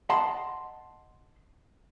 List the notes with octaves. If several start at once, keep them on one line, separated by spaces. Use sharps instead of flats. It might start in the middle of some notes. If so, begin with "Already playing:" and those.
D#5 F#5 A5 C6